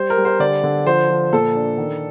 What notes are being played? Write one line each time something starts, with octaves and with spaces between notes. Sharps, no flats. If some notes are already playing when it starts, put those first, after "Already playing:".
Already playing: G3 C5
A#4
G3
C5
D3 D5
D3
F3 C5
F3
A#2 A4
D4
D#3